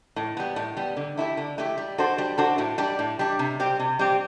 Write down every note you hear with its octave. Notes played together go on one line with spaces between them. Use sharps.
A2
G3 B3
A2
G3 B3
D3
A3 E4 G4
D3
A3 E4 G4
G3
D4 F#4 A4 C5
G3
D4 F#4 A4 C5
A2
G3 D4
A2
G3 D4
C3
G3 C4 G4
C3
G3 C4 G4